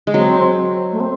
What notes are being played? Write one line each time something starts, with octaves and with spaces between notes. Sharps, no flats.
G#3
F#3 C4
A3
C4